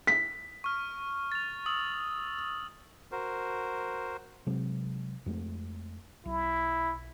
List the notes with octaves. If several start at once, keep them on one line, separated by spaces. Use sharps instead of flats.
B6
C#6 F6
A6 F7
D#6 E6 F#7
F#4 A#4 C5
C3 F#3 G#3
F2 G#3 A3
B1 E4